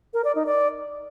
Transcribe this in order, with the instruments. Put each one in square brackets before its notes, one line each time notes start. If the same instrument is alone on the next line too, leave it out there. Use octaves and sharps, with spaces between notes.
[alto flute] A#4
D5
D#4
D5